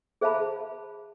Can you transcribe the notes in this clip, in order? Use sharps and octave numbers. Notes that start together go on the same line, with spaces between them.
G#4 C5 E5 F5 A5 B5